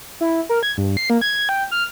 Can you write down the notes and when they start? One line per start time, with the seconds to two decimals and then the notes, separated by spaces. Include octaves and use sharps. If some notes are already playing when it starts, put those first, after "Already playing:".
0.21 E4
0.49 A#4
0.63 G#6
0.77 G2
0.97 C7
1.10 A#3
1.21 G#6
1.49 G5
1.71 F6